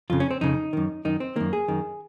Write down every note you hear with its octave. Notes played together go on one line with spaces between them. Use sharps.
F2 C#3 F4
C#4
C4
F2 C#3 D#4
F#2 D#3
F#2 D#3 D#4
C4
F#2 D#3 A#3
G#4
F#2 D#3